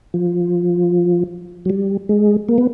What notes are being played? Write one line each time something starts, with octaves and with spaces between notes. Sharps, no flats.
F3
F#3
G3
G#3
A#3
B3